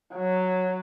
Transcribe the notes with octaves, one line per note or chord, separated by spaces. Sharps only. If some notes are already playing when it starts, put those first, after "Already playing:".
F#3